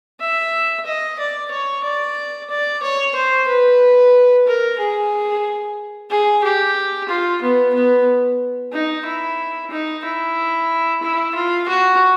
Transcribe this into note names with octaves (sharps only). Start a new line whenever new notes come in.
E5
D#5
D5
C#5
D5
D5
C#5
C5
B4
A#4
G#4
G#4
G4
F4
B3
B3
D#4
E4
D#4
E4
E4
F4
F#4